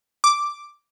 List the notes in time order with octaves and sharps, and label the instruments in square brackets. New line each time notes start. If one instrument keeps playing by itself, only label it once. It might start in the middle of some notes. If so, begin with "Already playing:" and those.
[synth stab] D6